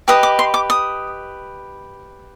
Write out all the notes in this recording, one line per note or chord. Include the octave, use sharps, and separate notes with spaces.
G4 B4 D#5 D#6
D6
C6
D6
D#6